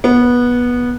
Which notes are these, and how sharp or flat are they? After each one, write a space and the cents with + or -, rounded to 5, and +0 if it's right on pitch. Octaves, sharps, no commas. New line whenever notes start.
B3 -15